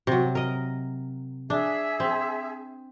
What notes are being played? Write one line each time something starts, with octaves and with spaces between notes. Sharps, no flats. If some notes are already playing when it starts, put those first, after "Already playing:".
C3 F#3
A#4 D#5
D4 G#4 E5
C4